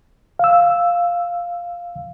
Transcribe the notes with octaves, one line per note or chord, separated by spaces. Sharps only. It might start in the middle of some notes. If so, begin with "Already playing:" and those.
F5 E6